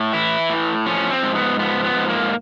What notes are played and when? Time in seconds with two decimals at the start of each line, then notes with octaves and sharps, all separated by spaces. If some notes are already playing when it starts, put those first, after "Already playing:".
Already playing: A2
0.13 E3 E4
0.50 A2
0.86 F3 C#4
1.10 C4
1.23 G#2
1.35 B3
1.59 F3 B3
1.84 B3
1.97 G#2
2.09 A#3